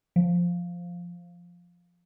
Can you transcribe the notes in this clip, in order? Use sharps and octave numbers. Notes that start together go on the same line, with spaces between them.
F3